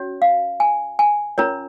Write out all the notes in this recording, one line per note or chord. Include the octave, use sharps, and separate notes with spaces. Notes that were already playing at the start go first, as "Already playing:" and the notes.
Already playing: C#4 F#4 C#5
F5
G#5
G#5
C#4 F4 A#4 C#5 A#5